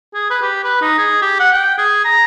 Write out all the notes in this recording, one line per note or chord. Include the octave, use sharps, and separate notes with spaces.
G#4
B4
G4
B4
D#4
G#4
G4
F#5
G5
G#4
A#5